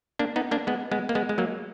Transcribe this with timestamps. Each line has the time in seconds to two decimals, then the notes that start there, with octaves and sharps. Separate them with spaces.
0.19 A#3 D4
0.36 B3 D#4
0.51 A#3 D4
0.67 G#3 B3
0.91 G#3 B3
1.09 A#3
1.15 G#3 B3
1.29 G#3
1.38 F#3 A#3